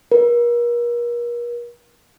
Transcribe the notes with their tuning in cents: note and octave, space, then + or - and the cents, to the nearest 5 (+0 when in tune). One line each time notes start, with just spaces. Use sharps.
A#4 +40